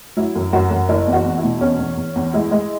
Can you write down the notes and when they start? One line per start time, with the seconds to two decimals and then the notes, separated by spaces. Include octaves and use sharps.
0.17 F#3 E4
0.35 F#2
0.53 F#2 F#4
0.71 F#2
0.89 F#1 E4
1.07 E2
1.13 F#4
1.25 E2
1.37 E4
1.43 B2
1.61 E2 C#4
1.79 E2
1.97 E2
2.16 E2
2.33 G#3 E4
2.51 G#3